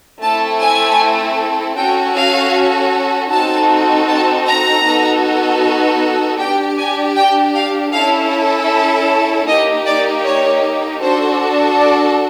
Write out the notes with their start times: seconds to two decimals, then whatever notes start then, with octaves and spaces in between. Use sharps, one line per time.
0.22 A3 C4 E4 A4 A5
0.61 G#5
1.76 C#4 F#4 A4 G5
2.15 F5
3.31 C4 D#4 F#4 A4 A5
4.08 A5
4.46 A#5
4.85 B3 D#4 F#4 A4
6.39 D4 G4 G5
6.78 G#5
7.16 G5
7.54 F5
7.93 C#4 E4 A4 F5
9.47 A#3 D#4 G4 D#5
9.86 D5
10.24 C#5
11.02 D4 F#4 A4 C5
11.78 D5